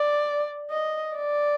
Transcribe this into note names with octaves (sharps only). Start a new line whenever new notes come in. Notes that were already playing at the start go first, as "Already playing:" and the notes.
Already playing: D5
D#5
D5